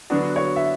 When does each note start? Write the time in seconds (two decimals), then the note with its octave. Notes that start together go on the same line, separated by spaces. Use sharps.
0.10 D3 F#3 B3 D4 F#4
0.36 C#5
0.56 E5